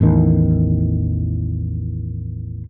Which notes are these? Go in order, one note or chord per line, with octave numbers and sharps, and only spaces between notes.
A1 E2 D#3